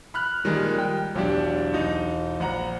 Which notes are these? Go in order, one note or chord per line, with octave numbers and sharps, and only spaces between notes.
B5 F6 F#6
A#2 D#3 F3 G3 G#3
G5
E1 B1 F#3 D4 G4
E1 D#4
A#1 F#5 A#5